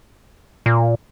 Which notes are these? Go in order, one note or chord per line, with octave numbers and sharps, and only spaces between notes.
A#2